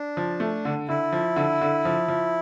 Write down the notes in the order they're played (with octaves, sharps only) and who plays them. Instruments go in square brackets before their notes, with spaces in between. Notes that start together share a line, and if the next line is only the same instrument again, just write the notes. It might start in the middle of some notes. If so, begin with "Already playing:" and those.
Already playing: [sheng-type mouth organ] D4
[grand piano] F3
A3
D3
[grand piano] D3 [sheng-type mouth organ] E4
[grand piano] F3
D3
D3
F3
F3